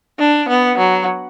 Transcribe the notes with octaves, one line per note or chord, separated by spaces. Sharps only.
D4
B3
F#3